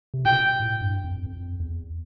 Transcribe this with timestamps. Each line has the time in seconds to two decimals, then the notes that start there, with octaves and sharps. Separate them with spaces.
0.14 C3
0.25 B2 G5
0.60 A2
0.81 G2
1.04 F2
1.26 F2
1.60 E2